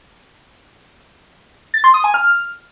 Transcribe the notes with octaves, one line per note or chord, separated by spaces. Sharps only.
A6
C6
D#6
G#5
F6